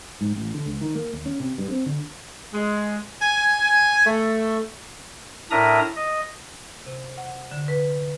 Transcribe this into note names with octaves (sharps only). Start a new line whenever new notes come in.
G#2
A1
D3
C#2
D#3
A#3
D#2
C#4
C3
G2
C4
D3
G#3
G#5
A3
A2 D4 A#4 E5 A#5 D#6
D#5
C3
F#5
D3
B4